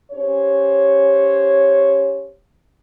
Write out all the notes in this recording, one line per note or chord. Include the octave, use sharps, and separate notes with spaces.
C#4 G4 C5 C#5